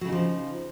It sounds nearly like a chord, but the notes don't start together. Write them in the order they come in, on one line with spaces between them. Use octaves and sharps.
F#3 C#3 D#4 F3